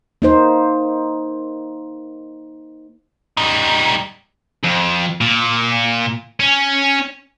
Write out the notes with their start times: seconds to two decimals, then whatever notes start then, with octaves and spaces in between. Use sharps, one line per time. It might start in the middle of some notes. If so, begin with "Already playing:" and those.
0.22 A#3 D#4 C5
3.37 G3 D#4
4.64 F2
5.21 A#2
6.40 C#4